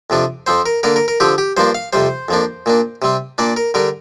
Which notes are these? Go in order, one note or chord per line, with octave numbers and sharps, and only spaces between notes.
F2 C3 F3 D4
F2 F3 C4 C5
A#4
D3 A#3 D4 A#4
A#4
A#4
D3 F3 C4 G4
G4
G2 F3 A#3 D4 C5
F5
F2 C3 G3 C5
F2 F3 A#3 D4
A#2 A#3 D4
C3 G3 C4
A#2 A#3 D4 D5
A#4
D3 G3 D4 A#4